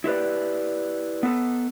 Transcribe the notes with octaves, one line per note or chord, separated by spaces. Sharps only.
E4 G4 B4 D5
B3 A4